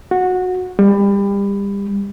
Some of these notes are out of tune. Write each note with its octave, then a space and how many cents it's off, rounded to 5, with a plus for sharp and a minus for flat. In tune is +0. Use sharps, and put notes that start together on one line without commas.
F#4 -15
G3 +30